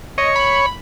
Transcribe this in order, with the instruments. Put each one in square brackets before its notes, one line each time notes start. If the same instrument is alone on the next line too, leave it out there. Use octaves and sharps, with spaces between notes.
[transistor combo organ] C#5 [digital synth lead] D#5
[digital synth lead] B5